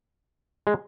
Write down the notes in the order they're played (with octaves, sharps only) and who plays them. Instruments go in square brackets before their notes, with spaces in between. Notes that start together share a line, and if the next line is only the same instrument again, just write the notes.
[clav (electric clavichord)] G#3